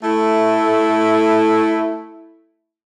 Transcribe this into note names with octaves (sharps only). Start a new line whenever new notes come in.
A3 E4